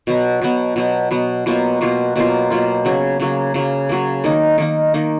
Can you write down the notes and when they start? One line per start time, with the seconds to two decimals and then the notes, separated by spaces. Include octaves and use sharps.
0.07 B2 F#3 B3
0.42 B2 F#3 B3
0.76 B2 F#3 B3
1.11 B2 F#3 B3
1.46 B2 F#3 A#3 F4
1.81 B2 F#3 A#3 F4
2.16 B2 F#3 A#3 F4
2.50 B2 F#3 A#3 F4
2.85 C#3 F#3 A#3
3.20 C#3 F#3 A#3
3.54 C#3 F#3 A#3
3.89 C#3 F#3 A#3
4.24 D#3 A#3 D#4
4.58 D#3 A#3 D#4
4.94 D#3 A#3 D#4